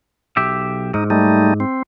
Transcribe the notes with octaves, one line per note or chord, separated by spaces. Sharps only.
B1 G4 E5
G#2 D#4
G3 A3 D#4
C4